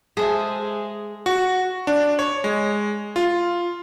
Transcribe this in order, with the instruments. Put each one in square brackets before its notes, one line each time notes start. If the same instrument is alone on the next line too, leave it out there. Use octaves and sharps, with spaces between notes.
[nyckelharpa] G#3 [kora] G#4 [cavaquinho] A4 C5 E5
[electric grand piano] F#4
D4
C#5
G#3
F4